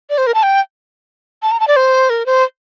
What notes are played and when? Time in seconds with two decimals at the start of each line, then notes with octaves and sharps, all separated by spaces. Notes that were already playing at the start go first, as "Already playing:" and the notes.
0.10 D5
0.18 C5
0.27 A#4
0.34 A5
0.43 G5
1.43 A5
1.52 A#5
1.60 A5
1.68 D5
1.76 C5
2.10 A#4
2.26 C5